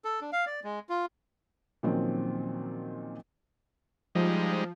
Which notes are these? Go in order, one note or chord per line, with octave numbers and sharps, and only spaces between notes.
A4
D4
F5
D5
G#3
F4
A#2 D#3 F3 F#3 C4 C#4
F3 G3 G#3 D#4